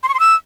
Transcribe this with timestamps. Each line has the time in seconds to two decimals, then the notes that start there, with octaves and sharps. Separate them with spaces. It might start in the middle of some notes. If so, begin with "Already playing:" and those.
0.03 C6
0.09 C#6
0.14 C6
0.20 E6